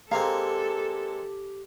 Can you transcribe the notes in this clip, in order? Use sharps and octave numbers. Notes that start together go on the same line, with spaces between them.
G#3 A#3 C4 G4 A4 F5 A#5